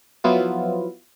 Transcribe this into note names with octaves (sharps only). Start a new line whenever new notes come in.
F3 F#3 B3 E4 F4